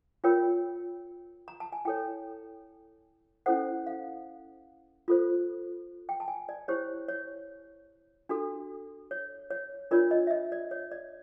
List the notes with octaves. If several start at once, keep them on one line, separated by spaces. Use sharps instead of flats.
F4 A#4 C#5 G5
A#5
A5
G#5
E4 A4 C#5 G5
C#4 E4 A4 C5 F#5
F5
F4 A4 C5
G5
A5
G#5
D5
E4 G4 C5 C#5
C#5
D4 F#4 A4
C#5
C#5
D4 F4 A#4 C#5 D5
D#5
E5
D#5
D5
C#5
D5